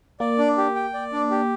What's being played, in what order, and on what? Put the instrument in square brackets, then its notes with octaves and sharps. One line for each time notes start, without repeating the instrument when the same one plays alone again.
[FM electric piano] A#3 [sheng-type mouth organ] D5
[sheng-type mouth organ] D4
G4
G5
D5
D4
G4